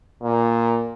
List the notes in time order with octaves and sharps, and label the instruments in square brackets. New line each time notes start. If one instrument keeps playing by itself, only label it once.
[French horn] A#2